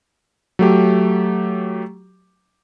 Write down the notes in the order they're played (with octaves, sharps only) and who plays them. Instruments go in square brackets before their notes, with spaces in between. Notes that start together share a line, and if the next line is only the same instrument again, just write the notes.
[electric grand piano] F#3 A3 G4